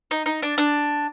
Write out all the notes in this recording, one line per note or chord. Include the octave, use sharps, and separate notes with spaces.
D#4
D#4
D4
D4